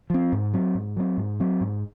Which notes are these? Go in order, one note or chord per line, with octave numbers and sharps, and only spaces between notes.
F3 C4
G#2
F#3 C4
G#2
F#3 C4
G#2
F#3 C4
G#2